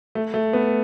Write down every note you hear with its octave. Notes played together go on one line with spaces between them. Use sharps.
A3
A3
B3